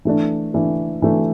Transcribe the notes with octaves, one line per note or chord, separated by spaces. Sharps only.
E3 A3 D4
E3 A3 D4
E3 A3 D4